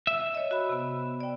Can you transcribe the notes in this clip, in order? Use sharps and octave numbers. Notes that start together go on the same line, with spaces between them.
E5
C#5 D#5
F#4 B5
C3 B3
D5 G5